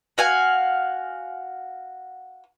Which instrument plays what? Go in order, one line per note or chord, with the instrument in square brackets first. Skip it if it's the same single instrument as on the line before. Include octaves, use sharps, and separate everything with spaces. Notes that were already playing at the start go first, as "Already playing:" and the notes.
[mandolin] F#4 F5 G#5